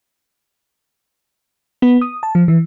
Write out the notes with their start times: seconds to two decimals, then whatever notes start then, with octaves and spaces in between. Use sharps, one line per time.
1.82 B3
2.01 D#6
2.23 A5
2.35 F3
2.48 E3